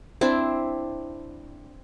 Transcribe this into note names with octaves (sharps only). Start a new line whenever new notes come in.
C4 D4 E4